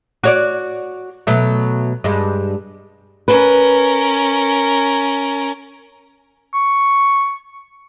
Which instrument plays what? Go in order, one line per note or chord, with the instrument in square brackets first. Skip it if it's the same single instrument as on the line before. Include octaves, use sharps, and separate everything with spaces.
[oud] F#4 C#5 D5
B2 F#3 A3
G2 G#3
[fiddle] C#4 A#4 [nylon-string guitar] B4
[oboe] C#6